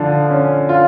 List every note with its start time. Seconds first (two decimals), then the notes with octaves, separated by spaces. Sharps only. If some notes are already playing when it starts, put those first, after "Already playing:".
Already playing: D3 F3
0.30 C#4
0.69 F4